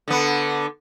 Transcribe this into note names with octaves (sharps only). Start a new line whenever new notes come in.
D3 B3